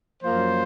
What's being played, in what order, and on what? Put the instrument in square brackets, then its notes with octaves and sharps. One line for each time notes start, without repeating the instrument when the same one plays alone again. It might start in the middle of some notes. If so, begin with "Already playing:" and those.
[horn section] F#2 F3 A#3 F4 C5